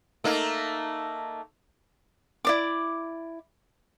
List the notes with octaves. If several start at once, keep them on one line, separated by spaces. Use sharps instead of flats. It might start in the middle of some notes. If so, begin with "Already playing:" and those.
A3 A#3 D#4
E4 D5 D6